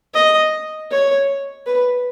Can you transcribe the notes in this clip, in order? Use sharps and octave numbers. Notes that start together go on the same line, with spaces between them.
D#5
C#5
B4